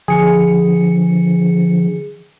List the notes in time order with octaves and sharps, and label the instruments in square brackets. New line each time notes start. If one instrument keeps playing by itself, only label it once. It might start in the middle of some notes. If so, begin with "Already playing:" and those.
[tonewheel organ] D3 F3 [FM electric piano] G#4 C#7